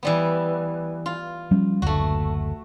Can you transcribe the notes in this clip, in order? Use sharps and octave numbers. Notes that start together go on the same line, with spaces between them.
E3 G3 B3
F4
F3 G3 C#4
F#1 D2 A3 F#4